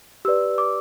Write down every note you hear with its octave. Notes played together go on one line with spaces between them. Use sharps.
G4 B4 D5 E6
D6